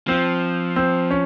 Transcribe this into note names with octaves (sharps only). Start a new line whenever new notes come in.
F3 C4
C4
C#4